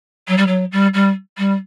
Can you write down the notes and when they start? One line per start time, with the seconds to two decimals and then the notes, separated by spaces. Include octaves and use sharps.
0.28 F#3
0.38 G3
0.47 F#3
0.72 G3
0.94 G3
1.38 G3